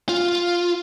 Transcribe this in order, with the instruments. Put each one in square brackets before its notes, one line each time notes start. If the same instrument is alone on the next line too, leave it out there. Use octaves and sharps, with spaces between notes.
[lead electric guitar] F4